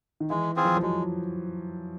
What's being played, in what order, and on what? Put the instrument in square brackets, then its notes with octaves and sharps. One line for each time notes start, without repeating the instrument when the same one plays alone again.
[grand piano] D#3
[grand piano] E3 [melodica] G#3
[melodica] C4 F4 G#4
[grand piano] F3
F3
[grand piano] F#3 [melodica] G#3